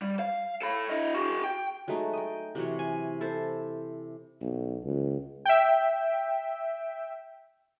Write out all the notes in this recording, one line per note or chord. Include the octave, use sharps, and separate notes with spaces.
G3
F5
A4 B5
E4 D#5
F#4 G#4
G5
F#3 G#3 A3 D#4
D#5 G5
C3 E3 F#3 C#5
G#5
E4 A4 C5 A5
B1
C#2
E5 G5